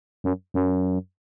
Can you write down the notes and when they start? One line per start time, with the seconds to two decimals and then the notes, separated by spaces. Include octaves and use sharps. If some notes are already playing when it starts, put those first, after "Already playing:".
0.24 F#2
0.54 F#2